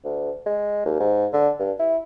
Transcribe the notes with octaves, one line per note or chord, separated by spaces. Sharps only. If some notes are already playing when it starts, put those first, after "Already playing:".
D2
G#3
D#2
G#2
D3
G2
E4